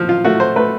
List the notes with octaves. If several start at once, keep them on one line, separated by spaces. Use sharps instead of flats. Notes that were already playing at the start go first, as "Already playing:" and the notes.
Already playing: F3
F4
A3 F#4
C5
A3 B4